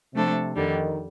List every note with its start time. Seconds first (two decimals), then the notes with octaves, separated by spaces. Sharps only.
0.14 C3 F3 A3 D4 A4 C5
0.56 F2 D3 D#3 G3